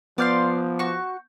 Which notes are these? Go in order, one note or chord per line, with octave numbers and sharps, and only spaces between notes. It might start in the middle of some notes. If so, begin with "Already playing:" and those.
F3 B3 D5 F5 C6 D6 G6
F#4 C#6